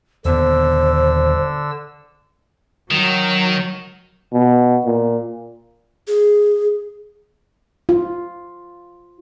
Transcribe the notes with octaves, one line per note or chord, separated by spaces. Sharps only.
D#1 D#2 D3 B3 C5 E6
D#3 F#3
B2
A#2
G#4
F4